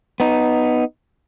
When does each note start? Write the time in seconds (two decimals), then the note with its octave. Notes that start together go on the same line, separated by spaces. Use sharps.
0.20 B3 D#4